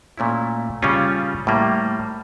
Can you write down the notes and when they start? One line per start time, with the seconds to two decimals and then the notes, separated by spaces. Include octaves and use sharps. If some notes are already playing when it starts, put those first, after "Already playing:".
0.18 A#2 A3 C#4 E4
0.82 C#3 G3 C#4 F4
1.47 A2 G3 A#3